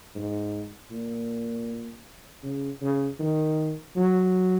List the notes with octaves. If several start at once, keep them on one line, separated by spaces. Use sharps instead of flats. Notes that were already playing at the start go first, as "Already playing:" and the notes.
G#2
A#2
C#3
C#3
D#3
F#3